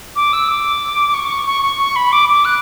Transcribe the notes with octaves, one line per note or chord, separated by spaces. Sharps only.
D6
E6
D6
C#6
C#6
C#6
C#6
B5
D6
D6
F#6